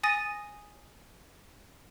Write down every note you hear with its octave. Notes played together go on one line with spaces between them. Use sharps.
G#5 D#6 A6 A#6 D#7